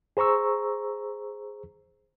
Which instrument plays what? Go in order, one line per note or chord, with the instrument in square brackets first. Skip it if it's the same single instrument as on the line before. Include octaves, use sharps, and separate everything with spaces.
[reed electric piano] G#4 C5 A#5 C#6 E6